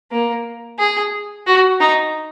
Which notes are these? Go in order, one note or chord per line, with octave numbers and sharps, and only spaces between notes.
A#3
G#4
F#4
D#4